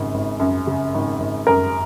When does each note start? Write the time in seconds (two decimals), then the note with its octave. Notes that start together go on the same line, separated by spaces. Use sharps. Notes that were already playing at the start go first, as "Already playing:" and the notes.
Already playing: G#1 F#2 C#3
0.14 G#1
0.40 F#2
0.67 C#3
0.94 G#1
1.20 G#1
1.47 F#2 A#4